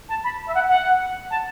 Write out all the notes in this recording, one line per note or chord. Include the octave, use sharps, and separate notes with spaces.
A5
B5
E5
F#5
F#5
A5